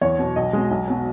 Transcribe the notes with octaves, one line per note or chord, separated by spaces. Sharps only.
E2 C#5
B2 F#3
B1 D#5
B2 G#3
B1
B2 F#3